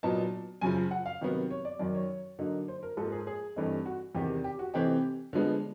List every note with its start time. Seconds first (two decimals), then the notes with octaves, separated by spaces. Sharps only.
0.03 A#2 F#3 B3 D#4 A5
0.61 F#2 C#3 F3 G#5
0.91 F#5
1.06 F5
1.21 C3 D#3 F#3 B3
1.50 C#5
1.65 D5
1.79 F#2 D#3 F#3 D5
1.95 C#5
2.38 D3 F#3 A#3 D#4
2.68 C5
2.83 A#4
2.97 G#2 F3 A#3 A4
3.12 G#4
3.27 G#4
3.56 G2 E3 A3 C4 D#4
3.86 F#4
4.15 E2 C3 D#3 G4
4.44 G4
4.59 F#4
4.74 C3 E3 A3 C4 D#4 G4
5.33 D3 F3 G#3 B3